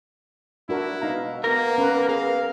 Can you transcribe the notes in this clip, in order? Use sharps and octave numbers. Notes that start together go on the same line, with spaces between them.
D4 E4 F#4 A#4
B2 D#4 F5 A#5
A#3 B3 A#4
C#4 B4
G#4 F5